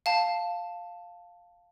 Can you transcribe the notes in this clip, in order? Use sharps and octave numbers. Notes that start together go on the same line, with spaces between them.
F5 A5